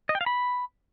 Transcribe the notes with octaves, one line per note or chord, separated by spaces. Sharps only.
D#5
G5
F5
B5